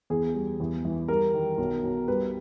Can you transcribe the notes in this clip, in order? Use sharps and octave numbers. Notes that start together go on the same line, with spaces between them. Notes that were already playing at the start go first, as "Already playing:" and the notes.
E2 G#4
G3
E2
E3
G3 A#4
D#3
B1
B1
G3 B4